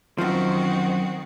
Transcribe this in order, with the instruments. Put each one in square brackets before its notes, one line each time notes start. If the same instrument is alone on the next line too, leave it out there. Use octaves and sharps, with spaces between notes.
[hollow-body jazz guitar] F#2 F3 [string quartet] D#3 C4 F#4